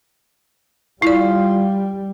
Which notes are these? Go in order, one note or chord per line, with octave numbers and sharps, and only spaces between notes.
G3 E4 F4 D5